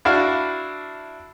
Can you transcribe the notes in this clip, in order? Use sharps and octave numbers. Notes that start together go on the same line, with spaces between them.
D4 E4 F#4 F5